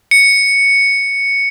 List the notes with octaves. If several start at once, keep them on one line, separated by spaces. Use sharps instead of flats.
C#7